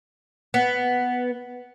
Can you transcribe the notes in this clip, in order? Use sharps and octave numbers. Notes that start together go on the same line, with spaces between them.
B3